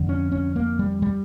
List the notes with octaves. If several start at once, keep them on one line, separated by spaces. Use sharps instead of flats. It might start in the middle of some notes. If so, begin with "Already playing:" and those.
Already playing: F2 D3
C#4
C#4
A#3
G3
G3